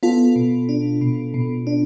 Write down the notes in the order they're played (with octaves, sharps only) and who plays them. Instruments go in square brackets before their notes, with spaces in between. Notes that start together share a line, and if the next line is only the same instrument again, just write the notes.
[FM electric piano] B3 F4 A4
B2
D4
B2
B2
D4